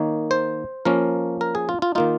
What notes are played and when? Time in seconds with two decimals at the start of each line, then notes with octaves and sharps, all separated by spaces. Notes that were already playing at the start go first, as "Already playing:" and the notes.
Already playing: D#3 A#3 D#4 C#5
0.31 C5
0.85 F3 A#3 C#4 A#4
1.41 A#4
1.55 G#4
1.69 F4
1.82 F4
1.95 D#3 A#3 D#4 F4